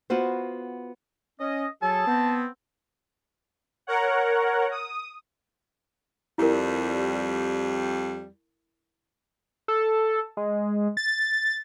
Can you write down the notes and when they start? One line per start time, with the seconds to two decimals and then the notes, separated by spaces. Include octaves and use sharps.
0.10 B3 F4 F#4 C5
1.40 C#4 D#5
1.83 F#3 G#4 A4 A5
2.07 B3 C4
3.87 A#4 C#5 F#5
4.71 D#6
6.38 F2 G3 E4 A#4
9.68 A4
10.37 G#3
10.97 A6